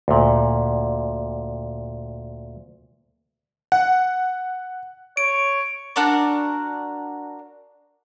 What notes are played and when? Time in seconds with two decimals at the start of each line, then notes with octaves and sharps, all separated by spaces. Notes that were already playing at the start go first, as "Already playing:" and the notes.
0.08 D2 A#2
3.72 F#5
5.17 C#5 D7
5.96 D4 F#4 A#4 D5